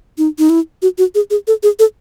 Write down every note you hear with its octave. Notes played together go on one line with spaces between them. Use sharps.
D#4
D#4
E4
F#4
F#4
G#4
G#4
A4
G#4
A4